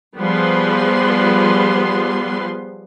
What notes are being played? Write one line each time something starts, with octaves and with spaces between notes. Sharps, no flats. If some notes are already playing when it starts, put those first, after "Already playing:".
F3 G3 B3 G#4 B4 C6